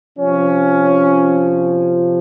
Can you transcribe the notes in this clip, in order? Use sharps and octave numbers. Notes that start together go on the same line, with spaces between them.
C3 F3 C#4